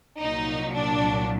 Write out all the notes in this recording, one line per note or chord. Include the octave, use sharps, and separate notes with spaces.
C2 A#2 F#3 D#4
D4